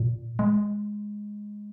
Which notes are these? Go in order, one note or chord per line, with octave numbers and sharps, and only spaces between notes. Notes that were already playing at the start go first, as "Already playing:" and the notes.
Already playing: A#2
G#3